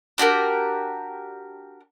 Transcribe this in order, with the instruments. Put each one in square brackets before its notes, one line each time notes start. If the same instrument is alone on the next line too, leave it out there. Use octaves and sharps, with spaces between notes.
[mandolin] D4 F#4 G4 A#4